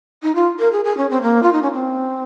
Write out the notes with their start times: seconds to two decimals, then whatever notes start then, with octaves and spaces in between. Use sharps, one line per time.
0.23 D#4
0.35 F4
0.59 A#4
0.72 G#4
0.84 G#4
0.97 C#4
1.10 C4
1.22 A#3
1.43 F4
1.53 D#4
1.62 C#4
1.73 C4